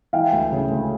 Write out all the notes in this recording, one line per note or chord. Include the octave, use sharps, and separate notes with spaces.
E3 F5 G5
D2
C#3
D2